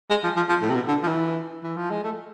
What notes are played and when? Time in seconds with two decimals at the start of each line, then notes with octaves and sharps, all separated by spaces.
0.10 G#3
0.24 F3
0.36 F3
0.49 F3
0.62 A2
0.70 C3
0.75 B2
0.88 D3
1.03 F3
1.07 E3
1.63 E3
1.77 F3
1.91 G#3
2.04 A3